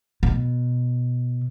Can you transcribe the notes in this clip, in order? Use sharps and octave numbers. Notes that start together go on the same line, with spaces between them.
B2